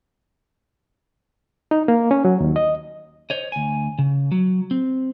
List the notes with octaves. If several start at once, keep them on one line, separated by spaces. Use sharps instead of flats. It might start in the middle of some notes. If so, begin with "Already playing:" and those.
D#4
A#3
C#4
F#3
D#2
D#5
C5 C#5 D#5
D2 G#5
C#3
F#3
C4